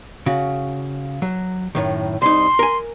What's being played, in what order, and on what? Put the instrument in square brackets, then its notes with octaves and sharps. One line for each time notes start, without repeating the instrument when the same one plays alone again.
[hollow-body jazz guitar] C#3 F#4
F#3
F#2 A2 D#3
[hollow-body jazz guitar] C2 D#4 [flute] C6
[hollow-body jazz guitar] A#4 G#5